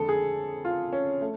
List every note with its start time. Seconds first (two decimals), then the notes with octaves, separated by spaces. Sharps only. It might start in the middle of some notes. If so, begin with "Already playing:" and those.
Already playing: F2 D3 G#3 A4
0.09 G#4
0.65 F4
0.93 C#4
1.21 A3